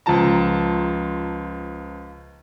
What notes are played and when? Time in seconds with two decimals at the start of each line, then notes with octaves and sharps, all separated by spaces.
0.06 C#2 F3 F4 A5 A#5